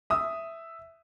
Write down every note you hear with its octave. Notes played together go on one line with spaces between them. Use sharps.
E5 D#6